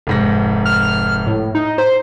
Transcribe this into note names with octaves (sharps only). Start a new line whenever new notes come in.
F1 G#2 A#6
F6
A2
D#4
C5